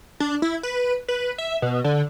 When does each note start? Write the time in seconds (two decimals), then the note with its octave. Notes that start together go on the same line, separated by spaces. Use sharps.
0.20 D4
0.42 E4
0.63 B4
1.08 B4
1.38 E5
1.62 B2
1.84 D3